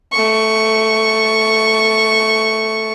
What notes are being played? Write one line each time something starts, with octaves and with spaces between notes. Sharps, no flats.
A3 C#6